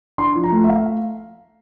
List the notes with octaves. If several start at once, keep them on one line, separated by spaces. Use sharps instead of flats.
D4 C6
F3
A#5
A3
E5
A3 F5